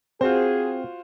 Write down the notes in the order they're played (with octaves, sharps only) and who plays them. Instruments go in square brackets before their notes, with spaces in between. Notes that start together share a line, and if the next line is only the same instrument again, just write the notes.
[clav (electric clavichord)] C4 [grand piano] F4 F#4 C5 [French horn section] G#4